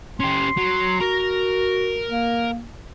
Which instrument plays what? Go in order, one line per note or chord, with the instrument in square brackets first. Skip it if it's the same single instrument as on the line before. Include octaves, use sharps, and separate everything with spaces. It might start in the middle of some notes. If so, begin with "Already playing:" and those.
[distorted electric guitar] C#4 G4 [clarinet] C6
[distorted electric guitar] F#3
[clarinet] F#4 [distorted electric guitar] A#4 A#5
[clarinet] A#3